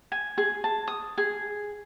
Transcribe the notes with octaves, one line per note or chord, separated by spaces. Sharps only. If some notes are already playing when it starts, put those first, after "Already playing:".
G#5
G#4
A5
D#6
G#4